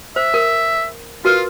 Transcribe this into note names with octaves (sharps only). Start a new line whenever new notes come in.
C5 E5
A#4
F4 F#4 A#4 B4